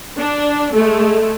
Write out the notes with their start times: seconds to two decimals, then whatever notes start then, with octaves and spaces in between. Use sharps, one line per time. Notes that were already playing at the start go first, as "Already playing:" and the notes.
0.19 D4
0.74 G#3 A3